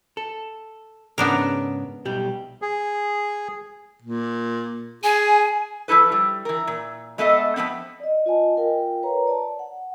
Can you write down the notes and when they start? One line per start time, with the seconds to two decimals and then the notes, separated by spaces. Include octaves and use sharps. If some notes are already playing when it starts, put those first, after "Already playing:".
0.17 A4
1.18 G#2 C#3 B3 C#4 D4 A#4
2.05 B1 G3 G4
2.62 G#4
4.02 A#2
5.03 G#4 G#5
5.88 F3 G#3 E4 A4 B4
6.12 G3
6.45 E3 A#4
6.67 A#2
7.18 G#3 A3 B3 A4 D#5 E5
7.56 F3 G#3 B3 C4
8.00 D5 D#5
8.26 F4 D#5 G#5 A5
8.57 F4 A#4 F5 G5
9.03 B4 C#5 A#5
9.27 D5 A5
9.59 F#5